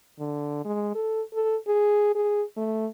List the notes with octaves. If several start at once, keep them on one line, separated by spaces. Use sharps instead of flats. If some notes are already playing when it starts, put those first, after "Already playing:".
D3
G#3
A4
A4
G#4
G#4
A3